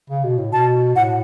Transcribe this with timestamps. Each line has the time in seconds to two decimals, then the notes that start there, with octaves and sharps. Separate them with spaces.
0.10 C#3
0.24 B2
0.38 A2
0.52 B2 A5
0.95 A2 F#5